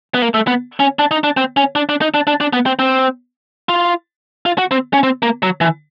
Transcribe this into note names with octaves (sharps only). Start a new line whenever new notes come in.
B3
A#3
A3
B3
C#4
D4
D#4
D4
C4
C#4
D4
D4
D#4
D4
D4
D4
B3
C4
C4
F4
F4
F#4
C4
C#4
C4
A#3
F#3
E3